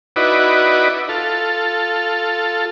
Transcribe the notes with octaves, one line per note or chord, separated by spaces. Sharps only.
D#4 E4 F#4 B4 D5
F4 A4